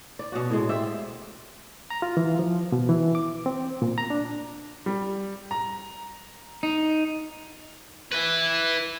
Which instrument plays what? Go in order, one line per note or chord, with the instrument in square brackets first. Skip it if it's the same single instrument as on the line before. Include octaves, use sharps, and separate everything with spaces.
[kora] D5
B2 C#4 F#4
A2 G#3
G4 C5 D5 E5
[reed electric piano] A#5
F4
E3
F3
B2
E3
D6
C4
A#2
A#5
D4
[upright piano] G3
A#5
[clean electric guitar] D#4
[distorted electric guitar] E4 B4